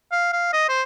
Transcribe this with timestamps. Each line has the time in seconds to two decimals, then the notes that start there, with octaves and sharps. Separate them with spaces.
0.12 F5
0.33 F5
0.53 D#5
0.69 C5